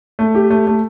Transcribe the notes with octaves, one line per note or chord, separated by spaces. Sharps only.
A3
G4
A3
A3